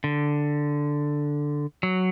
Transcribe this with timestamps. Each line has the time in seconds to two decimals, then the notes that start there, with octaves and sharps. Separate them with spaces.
0.04 D3
1.83 F#3